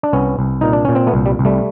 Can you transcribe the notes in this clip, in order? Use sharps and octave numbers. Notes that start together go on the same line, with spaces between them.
D4
C2 B3 C#4
C2
A#2 D#4
D4
A#2 C#4
C4
A3 B3
C2
G3
C2
G3 A3